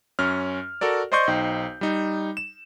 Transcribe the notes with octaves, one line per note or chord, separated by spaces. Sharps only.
F#2 C#4 F6
F#4 A4 A#4 D5
C5 D5 D#5 C6 C#6 G6
B1 D#4 C5 G5
G3 D#4
E7